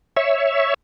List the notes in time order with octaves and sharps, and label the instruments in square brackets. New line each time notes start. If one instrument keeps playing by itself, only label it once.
[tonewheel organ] C#5 E5